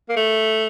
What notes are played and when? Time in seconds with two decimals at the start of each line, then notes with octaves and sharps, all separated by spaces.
0.09 A#3
0.16 A3